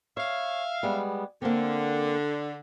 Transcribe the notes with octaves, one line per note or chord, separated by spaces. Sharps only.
C#5 E5 F5
G3 G#3 B3
D3 A#3 C4